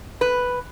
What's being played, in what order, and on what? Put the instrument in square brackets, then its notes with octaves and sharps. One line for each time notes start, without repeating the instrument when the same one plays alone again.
[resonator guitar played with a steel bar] B4